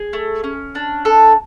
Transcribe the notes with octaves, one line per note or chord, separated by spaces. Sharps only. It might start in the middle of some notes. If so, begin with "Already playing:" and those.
Already playing: G#4
A3
C#4
D4
A4